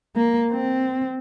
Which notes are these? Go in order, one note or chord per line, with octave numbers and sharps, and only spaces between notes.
A#3
C4